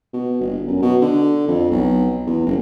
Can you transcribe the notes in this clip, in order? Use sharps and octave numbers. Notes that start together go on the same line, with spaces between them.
B2
G1
F#2
B2
D3
F2
B1
E2
F#1